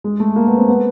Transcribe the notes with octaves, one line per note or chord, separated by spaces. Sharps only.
G#3
A3
A#3
B3
C4
B3